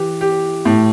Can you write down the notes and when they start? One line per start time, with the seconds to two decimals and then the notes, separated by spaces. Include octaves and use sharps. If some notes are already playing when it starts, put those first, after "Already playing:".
Already playing: E3 G4
0.21 G4
0.65 A2